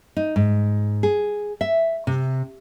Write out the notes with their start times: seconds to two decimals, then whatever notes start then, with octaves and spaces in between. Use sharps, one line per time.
0.17 D#4
0.36 G#2
1.03 G#4
1.61 E5
2.07 C3